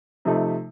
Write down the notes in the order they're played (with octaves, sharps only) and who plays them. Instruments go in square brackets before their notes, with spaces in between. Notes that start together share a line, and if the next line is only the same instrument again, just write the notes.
[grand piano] C3 F3 A3 D#4